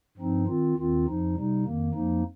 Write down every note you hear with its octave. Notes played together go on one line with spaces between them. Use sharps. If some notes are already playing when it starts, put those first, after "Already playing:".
G2 F3 C4 D#4
D#3 C4 F4
D#2 D#3 C4 F4
F2 F3 D#4
C3 G3 D#4
F2 D#3 A#3
F2 F3 A#3 D#4